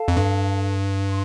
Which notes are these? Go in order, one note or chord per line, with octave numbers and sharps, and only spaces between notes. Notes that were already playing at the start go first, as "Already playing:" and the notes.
Already playing: A4 F5 A5
F2
G2
C6